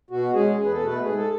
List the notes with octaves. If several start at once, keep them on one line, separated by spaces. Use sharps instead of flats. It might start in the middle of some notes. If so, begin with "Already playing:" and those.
B2 F#4
G#3 C#4 G#4
E2 G#4
B4
A4
B2 A3
B4
G#2 G#4
A4